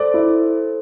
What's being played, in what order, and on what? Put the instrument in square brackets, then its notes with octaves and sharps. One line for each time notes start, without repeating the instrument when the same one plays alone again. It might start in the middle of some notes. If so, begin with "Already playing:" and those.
Already playing: [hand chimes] A4 C5 [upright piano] D5
[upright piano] E4